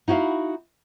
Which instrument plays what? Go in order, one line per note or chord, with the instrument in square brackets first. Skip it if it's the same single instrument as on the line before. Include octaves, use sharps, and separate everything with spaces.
[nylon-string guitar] D#4 E4 F#4 E5 F5